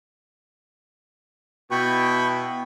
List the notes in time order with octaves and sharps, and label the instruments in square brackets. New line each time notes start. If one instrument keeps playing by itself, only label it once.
[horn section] B2 E4 [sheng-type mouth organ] G5 B5 C#6